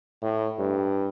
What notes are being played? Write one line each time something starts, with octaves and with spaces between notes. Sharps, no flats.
A2
G2